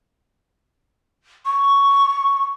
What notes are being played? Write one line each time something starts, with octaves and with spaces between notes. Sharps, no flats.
C#6